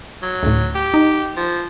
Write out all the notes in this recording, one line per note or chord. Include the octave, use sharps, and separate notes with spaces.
F#3
D2 A2
G4
D#4
F3